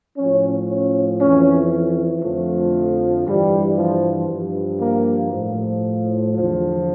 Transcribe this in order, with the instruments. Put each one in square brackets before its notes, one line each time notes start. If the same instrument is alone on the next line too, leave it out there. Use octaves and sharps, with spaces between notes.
[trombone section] A2 F3 C#4
C#4
F2 E3 C#4
F2 D3 F3 A3
G2 E3 G3
F3
G2 F3
A#3
A2 F3
E2 D3 F3